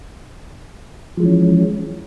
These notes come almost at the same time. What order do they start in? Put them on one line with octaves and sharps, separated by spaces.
F3 G#3 E3 C#4